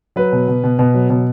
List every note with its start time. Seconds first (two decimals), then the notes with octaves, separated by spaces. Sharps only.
0.16 F#3 B4
0.32 B2
0.48 B2
0.64 B2
0.79 B2
0.94 F#3
1.10 B2